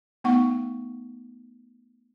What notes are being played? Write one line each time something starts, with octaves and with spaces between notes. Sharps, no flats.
A3 B3 D#4 F#5 C#6